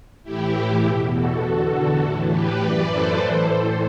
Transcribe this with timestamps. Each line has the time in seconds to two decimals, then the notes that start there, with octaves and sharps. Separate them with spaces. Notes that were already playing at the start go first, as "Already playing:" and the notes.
0.24 A2 E3 E4 G4
0.82 B2
0.88 E2
1.12 F#4 A4
1.42 E2 D3
2.00 A2 E3
2.30 G4 B4
2.59 F#2 E3 B4 D5
2.88 A4 C5
3.18 A2 E3